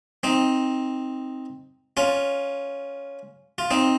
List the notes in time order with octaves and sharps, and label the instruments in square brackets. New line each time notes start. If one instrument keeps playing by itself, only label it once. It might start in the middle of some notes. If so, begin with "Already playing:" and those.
[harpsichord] C4 D#4
C#4 F4
F4
C4 D#4